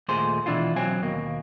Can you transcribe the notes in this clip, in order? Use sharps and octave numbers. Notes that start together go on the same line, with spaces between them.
D#2 A#2 A3 G#4 C5 C6
B2 E3 D4 E4 F4
B1 F#3 C4 G#5
D#2 B2 A#3